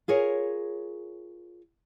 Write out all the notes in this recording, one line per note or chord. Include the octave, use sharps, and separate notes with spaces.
F4 G#4 A#4 C#5